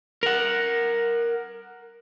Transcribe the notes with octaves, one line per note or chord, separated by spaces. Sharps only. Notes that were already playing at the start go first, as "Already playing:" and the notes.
A#4 F#5